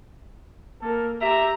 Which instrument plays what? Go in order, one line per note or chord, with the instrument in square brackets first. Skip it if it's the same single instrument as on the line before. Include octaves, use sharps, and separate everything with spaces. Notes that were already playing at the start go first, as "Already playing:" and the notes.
[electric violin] A#3 A#4 [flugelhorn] A4
[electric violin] G4 A#6 [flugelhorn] E5 [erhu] A#5